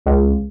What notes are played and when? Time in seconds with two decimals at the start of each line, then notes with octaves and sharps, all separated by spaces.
0.06 C#2